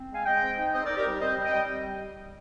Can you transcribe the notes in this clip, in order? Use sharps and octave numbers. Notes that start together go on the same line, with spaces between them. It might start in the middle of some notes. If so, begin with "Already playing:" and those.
Already playing: C4
G#3 F5 G#5
G#3 D#5 G5
C4
D#4
C4 C5 D#5
D#4 A#4 D5
G4 A#4
G3
C4 C5 D#5
G3
D#5 G5
G3